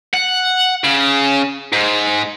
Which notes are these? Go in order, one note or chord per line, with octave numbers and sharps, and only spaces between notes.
F#5
C#3
G#2